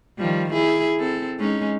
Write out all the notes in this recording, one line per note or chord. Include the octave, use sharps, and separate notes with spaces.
D#3 F3 G3
E4 G#4
C4 A4
G#3 C#4 D#4